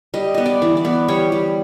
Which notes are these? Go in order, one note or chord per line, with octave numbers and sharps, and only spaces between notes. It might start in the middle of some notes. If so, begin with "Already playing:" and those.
G3 D#5
B3 D#5
D5
E3
D5
B3
G3 C#5
G3